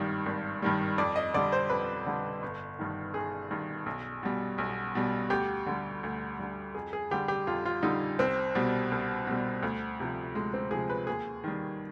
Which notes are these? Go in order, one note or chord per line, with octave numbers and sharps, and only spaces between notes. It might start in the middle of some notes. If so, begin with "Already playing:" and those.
Already playing: G#1 G2 D#3 G3
G#1
G2 D#3 G3
F2 D5
D#5
D3 G3 D5
C5
F2 B4
D3 G3
G1
G2 D#3
G1 G#4
G2 D#3
B1
B2 G3
B1
B2 G3
D2 G4
D3 G3
D2
D3 G3
F2 G#4
G#4
D3 G3 G4
G4
F2 F4
F4
D3 G3 D#4
C2 C4
B2 G3
C2
B2 G3
D2
C3 F3
D2 G#3
C4
C3 F3 G#4
B4
D#2 G#4
D#3 G3